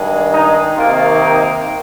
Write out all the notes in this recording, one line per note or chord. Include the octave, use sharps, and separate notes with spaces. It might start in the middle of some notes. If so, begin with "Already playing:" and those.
Already playing: G2 D#3 G#3
D#4
C3 D#3 A#3 F4
D#4